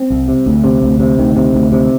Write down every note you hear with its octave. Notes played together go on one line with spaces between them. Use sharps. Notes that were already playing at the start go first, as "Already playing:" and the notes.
Already playing: C4
C2
C3
D2
C3
D2
C3
D2 D#3
C3
D2
C3